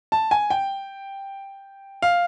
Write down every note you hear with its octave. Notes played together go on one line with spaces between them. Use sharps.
A5
G#5
G5
F5